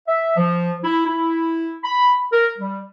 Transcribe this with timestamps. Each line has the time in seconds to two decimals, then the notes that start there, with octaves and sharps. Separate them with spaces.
0.06 E5
0.36 F3
0.84 E4
1.06 E4
1.84 B5
2.32 A#4
2.58 G3